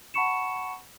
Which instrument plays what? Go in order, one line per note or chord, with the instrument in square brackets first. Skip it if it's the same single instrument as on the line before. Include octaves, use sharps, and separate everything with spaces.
[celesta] F#5 A5 B5 C#6 C#7 E7